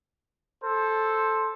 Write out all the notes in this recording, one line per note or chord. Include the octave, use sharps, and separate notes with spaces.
A4 C5